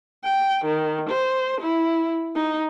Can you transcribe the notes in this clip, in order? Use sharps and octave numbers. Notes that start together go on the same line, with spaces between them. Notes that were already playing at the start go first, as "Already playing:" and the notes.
G5
D#3
C5
E4
D#4